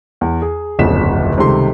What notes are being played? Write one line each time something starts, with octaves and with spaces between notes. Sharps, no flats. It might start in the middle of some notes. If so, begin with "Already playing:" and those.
E2
G#4
D1 G1 F2 C#3 B6 E7
C#2 C3 D#3 G3 A4 C6